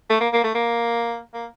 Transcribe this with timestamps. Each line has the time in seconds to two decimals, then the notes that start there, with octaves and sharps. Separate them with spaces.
0.10 A3
0.20 A#3
0.33 A#3
0.43 A3
0.54 A#3
1.34 A#3